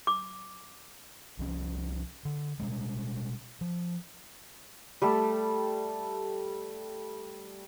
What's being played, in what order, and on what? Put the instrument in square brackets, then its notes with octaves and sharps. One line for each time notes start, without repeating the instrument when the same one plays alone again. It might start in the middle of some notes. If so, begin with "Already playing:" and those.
[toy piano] D6
[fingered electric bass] C2 F3 C#4
D3
B2 G3 G#3
F3
[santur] G3 A3 A4